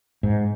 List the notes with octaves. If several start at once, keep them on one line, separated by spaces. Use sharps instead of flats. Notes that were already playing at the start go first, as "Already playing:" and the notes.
G#2